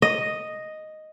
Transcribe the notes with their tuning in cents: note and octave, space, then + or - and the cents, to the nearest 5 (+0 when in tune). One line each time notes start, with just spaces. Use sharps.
D#5 +0